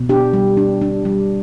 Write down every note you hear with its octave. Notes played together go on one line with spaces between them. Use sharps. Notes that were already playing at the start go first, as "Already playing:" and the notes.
Already playing: B2
D4 G4
G3
D4
D4
G3